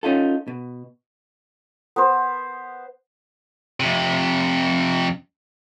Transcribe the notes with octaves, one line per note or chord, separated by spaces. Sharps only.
C#4 D#4 F4 A4
B2
B3 B4 C5
F2 C3